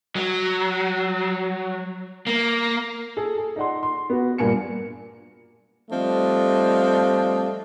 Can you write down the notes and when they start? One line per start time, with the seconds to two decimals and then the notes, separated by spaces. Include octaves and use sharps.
0.16 F#3
2.27 A#3
3.17 G#4 A4
3.38 G#4
3.56 D#4 D5 F#5 C6
3.83 C6
4.10 B3 F#4
4.38 G2 A#2 A#3 G#5 C#7
5.91 F3 G3 A3 C4 D4 D#5